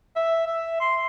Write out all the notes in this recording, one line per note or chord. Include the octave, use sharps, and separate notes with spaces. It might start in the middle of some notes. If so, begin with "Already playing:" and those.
E5
E5
C6